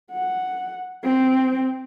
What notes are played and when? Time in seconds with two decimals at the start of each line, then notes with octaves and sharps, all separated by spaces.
0.12 F#5
1.04 C4